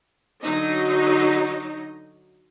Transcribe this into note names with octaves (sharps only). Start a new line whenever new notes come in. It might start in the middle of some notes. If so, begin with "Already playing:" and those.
D3 F#3 D#4 D#5